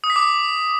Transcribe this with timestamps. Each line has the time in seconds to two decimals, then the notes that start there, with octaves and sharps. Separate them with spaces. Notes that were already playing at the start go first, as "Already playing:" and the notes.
0.04 D#6
0.10 B6
0.16 D6